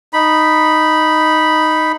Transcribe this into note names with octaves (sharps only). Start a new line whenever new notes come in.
D#4 B5